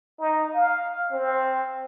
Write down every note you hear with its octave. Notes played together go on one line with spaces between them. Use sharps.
D#4
F5
C4